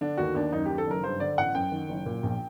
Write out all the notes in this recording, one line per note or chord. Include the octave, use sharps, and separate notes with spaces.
D3 D4
D#2 F#4
D#2 D4
F#2 D#4
D#3 G4
A4
F#1 A#4
G2 C5
D3 D5
A1 F#5
F#2 G5
D#3
F#1
A#2
A#1